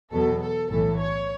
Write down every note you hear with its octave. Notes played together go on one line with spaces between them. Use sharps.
E2 B2 F#3 A4
A4
B1 A2 E3 A4
C#5